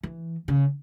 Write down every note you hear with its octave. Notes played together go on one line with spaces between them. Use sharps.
E3
C#3